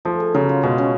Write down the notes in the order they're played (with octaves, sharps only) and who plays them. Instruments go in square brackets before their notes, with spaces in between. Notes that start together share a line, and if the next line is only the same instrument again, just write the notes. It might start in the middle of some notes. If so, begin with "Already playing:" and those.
[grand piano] F3 [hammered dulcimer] A3
[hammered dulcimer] G#4
[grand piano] C#3 [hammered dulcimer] F#3
[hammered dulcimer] F4
[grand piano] B2 [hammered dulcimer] G#3
[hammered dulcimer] C#4